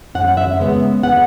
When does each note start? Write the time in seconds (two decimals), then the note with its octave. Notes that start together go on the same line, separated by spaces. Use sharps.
0.15 F#2 F#5
0.37 E5
0.59 C#3 G#3 B3
1.03 F#5